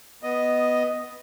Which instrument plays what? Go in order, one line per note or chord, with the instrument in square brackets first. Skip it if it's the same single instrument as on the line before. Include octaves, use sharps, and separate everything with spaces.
[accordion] B3 D#5